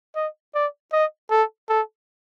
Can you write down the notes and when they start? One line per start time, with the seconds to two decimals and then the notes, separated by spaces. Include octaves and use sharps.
0.15 D#5
0.54 D5
0.93 D#5
1.31 A4
1.69 A4